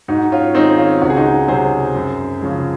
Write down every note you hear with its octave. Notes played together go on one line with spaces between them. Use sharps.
G#2 D#4 F#4
C#4 F4
D#3 G#3 C4 D#4
C#4 F4
C#2 F#4
G#4
D#4 F#4
C3 F#3 G#4 C5
F#2
C#3 F3 G#3